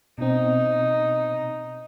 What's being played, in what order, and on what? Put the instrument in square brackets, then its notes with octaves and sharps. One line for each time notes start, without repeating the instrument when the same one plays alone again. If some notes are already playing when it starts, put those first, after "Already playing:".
[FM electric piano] B2 C4 [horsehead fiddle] D#4